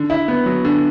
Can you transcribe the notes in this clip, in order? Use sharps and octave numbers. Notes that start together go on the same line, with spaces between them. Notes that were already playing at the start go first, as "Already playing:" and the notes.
Already playing: D3
E4
B3
F#3
D3